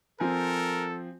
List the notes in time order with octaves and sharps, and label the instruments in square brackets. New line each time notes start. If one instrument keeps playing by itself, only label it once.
[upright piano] F3 C4 G#5 [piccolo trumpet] A4 [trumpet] A#4